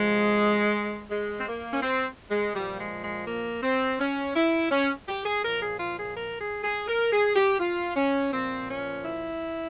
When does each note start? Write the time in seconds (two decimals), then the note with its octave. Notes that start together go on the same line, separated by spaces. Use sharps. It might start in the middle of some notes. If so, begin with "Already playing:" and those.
Already playing: C3 F3 G#3
1.10 G#3
1.40 C4
1.47 A#3
1.73 C#4
1.82 C4
2.30 G#3
2.55 A#2 F3 G3
2.79 G#3
3.03 G#3
3.27 A#3
3.63 C4
4.00 C#4
4.36 E4
4.71 C#4
5.08 G4
5.25 G#4
5.44 A#2 F3 A#4
5.62 G#4
5.79 F4
5.98 G#4
6.15 A#4
6.39 G#4
6.63 G#4
6.88 A#4
7.12 G#4
7.36 G4
7.60 F4
7.96 C#4
8.32 A#2 F3 C4
8.69 C#4
9.05 E4